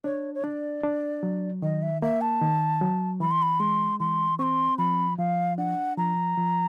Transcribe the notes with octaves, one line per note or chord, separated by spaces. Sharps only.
D4 C#5
C#5
D4 D5
D4
F#3
D#3 D#5
E5
A#3 E5
A5
D#3
F#3
E3 B5
C6
B5
G#3 C6
E3 C6
C4 C6 C#6
F3 B5
F3 F5
D4 F#5
F3 A#5
F3